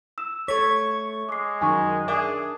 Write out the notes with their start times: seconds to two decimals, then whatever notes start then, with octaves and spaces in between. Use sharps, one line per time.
0.18 E6 E7
0.48 A3 C#5 C#6 G#6 B6
1.29 G#3 D6 C7
1.61 F#2 D#3 G#5 C#6
2.08 D4 G#4 A#4 E5 D6